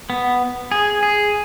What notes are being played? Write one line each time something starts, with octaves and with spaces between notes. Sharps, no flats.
B3
G#4
G#4